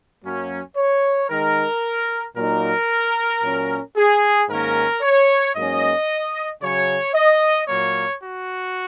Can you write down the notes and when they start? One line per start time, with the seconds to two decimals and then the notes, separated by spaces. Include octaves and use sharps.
0.24 F#2 F#3 A#3 C#4
0.76 C#5
1.30 D#3 G#3 D#4 A#4
2.36 A#2 F#3 A#3 D#4 A#4
3.42 A#2 F#3 C#4
3.96 G#4
4.49 G#2 D#3 A#3 C#4 A#4
5.02 C#5
5.55 G#2 F#3 A#3 C#4 D#5
6.61 C#3 F#3 C#4 C#5
7.14 D#5
7.68 A#2 F#3 A#3 C#5
8.22 F#4